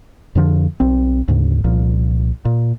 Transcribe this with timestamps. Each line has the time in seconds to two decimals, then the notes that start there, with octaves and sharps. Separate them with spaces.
0.35 F2 D3 F3
0.80 B1 C4
1.28 D2 G#2 C#3
1.64 C2 A#2 F3
2.45 A#2